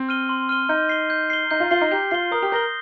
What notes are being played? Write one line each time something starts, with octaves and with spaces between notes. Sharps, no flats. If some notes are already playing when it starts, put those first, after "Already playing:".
Already playing: C4
F6 D#7 G7
C6
F6 D#7 G7
D#4 G6
C7 G7
G6
C7 G7
D#4 G6
F4
F4 C7 G7
D#4
G4 G6
F4 C7 G7
A#4 D#6
G4
A#4 G6 A#6 G7